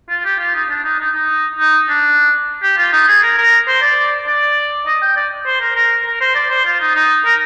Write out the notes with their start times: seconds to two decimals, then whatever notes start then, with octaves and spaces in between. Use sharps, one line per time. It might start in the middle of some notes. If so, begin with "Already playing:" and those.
0.10 F4
0.25 G4
0.39 F4
0.54 D#4
0.69 D4
0.84 D#4
0.99 D#4
1.15 D#4
1.59 D#4
1.89 D4
2.63 G4
2.78 F4
2.93 D#4
3.08 G#4
3.23 A#4
3.38 A#4
3.68 C5
3.82 D5
4.27 D5
4.87 D#5
5.02 G5
5.17 D5
5.47 C5
5.61 A#4
5.75 A#4
6.06 A#4
6.21 C5
6.35 D5
6.50 C5
6.65 F4
6.80 D#4
6.95 D#4
7.25 A#4